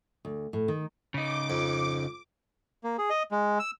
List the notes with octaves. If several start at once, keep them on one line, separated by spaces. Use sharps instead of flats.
D2
A2
D#3
C#3 D#4 D6
F2
A#3
G#4
D#5
G#3
E6